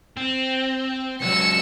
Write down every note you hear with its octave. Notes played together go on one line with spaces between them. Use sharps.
C4
C#2 F#3 E6 C#7